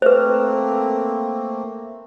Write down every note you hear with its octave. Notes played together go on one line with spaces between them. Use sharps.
A3 A#3 C4 B4 C5